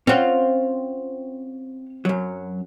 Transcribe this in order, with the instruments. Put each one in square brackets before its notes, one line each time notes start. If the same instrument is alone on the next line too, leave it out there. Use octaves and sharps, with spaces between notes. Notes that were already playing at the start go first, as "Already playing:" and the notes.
[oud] C4 F4 [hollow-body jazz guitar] C#4 F#5
[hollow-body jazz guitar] F#2 F#3